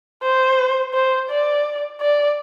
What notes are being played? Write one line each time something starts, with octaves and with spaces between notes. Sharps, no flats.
C5
C5
D5
D5